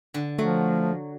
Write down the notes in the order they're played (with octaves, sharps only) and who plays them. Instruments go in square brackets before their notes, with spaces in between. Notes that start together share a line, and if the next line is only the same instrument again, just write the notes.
[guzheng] D3
[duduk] F3 [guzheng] F#3 [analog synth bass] A3